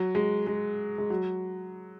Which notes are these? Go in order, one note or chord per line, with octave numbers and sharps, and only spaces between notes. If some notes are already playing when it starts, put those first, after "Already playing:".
Already playing: F#3
G#3
G#3
G#3
F#3